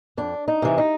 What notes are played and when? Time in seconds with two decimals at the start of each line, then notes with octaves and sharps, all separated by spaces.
0.17 F2 D4
0.48 D#4
0.62 C3 E3
0.78 D#4